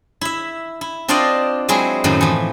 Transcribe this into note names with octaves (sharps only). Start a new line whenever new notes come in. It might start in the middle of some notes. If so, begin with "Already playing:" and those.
E4 E5
E4
C4 D4 F4 C5 D5 D#5
F#3 G#3 C4 E4 G#4
F#2 A2 D#3 F#3
E3 F3